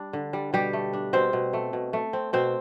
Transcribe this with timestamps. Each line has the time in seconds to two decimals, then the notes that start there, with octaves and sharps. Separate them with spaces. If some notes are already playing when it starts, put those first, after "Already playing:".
Already playing: G3 D4
0.13 D3
0.33 G3
0.53 B2 G3 G4
0.73 A3
0.93 D4
1.13 B2 C4 C5
1.33 B2
1.53 A3
1.73 B2
1.93 A3
2.13 C4
2.33 B2 C4 C5